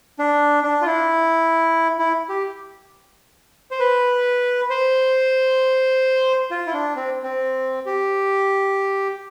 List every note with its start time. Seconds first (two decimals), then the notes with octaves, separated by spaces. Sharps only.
0.19 D4
0.64 D4
0.82 F4
0.86 E4
1.99 E4
2.29 G4
3.71 C5
3.80 B4
4.70 C5
6.51 F4
6.66 E4
6.73 D4
6.96 C4
7.23 C4
7.86 G4